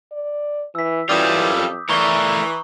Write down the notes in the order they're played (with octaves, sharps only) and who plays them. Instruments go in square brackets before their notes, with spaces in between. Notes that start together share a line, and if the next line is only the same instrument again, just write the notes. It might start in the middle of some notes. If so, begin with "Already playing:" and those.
[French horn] D5
[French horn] E3 [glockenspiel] E6 B6
[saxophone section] F#2 G3 [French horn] E3 [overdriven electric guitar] F4 A4 [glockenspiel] D6 D#6 G6
[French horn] F2
[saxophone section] E3 [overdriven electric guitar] A3 A#4 [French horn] D5 [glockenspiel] A#5 C#6 G7